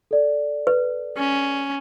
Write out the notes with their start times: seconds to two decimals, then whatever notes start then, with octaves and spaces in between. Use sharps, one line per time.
0.11 A4 D5
0.67 B4
1.17 C#4